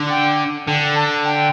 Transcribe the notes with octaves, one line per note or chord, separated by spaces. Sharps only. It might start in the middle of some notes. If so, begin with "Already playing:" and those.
Already playing: D3
G5
D3 G5
A5
G5